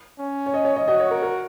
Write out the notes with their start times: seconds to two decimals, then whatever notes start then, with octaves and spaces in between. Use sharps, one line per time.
0.19 C#4
0.46 C#5
0.54 D#5
0.65 C#5
0.76 D#5
0.88 F#4 D#5
1.00 C#5
1.11 A#4
1.23 A#4